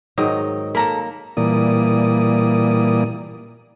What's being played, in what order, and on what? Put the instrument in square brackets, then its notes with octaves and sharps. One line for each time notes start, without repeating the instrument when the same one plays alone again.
[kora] G#2 D#3 F#3 [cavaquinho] D#5
[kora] A#3 [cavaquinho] A4 A#5 B5
[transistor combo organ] A#2 E3 G3 A#3 D5 D#6